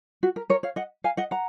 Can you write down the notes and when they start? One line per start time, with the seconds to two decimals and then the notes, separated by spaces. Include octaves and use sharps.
0.23 F#4
0.36 A#4
0.50 A#4 C#5
0.63 C#5 F5
0.76 D#5 F#5
1.04 F5 G#5
1.17 D#5 F#5
1.31 F#5 A#5